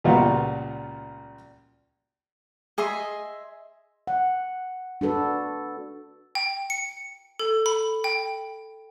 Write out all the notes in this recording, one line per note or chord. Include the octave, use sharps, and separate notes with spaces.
C#2 A#2 G3 B3 F4 F#4
G#4 D#5 E5 C6
F#5
D4 F#4 A4 B4
G5
C#7
A4
B5
G5